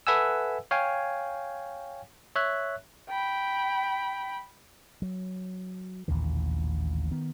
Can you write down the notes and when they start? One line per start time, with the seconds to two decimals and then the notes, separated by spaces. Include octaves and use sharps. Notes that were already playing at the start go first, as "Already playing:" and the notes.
0.07 A4 B4 E5 F#5 G#5 E6
0.71 C#5 F5 G5 G#5
2.35 C#5 E5 F#6
3.09 G5 B5
5.02 F#3
6.08 A1 D#2 A#2 D3
7.11 D#3 B3